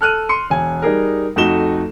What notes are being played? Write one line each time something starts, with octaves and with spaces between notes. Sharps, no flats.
A4 F6 F#6 D#7
C6 C#7
E1 G#5
G3 D#4 G#4 A#4
F2 A3 D#4 F#4 E7 G7